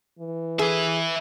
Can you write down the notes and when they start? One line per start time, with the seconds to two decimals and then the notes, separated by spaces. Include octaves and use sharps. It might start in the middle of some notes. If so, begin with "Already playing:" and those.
0.19 E3
0.59 G#4 B4 E5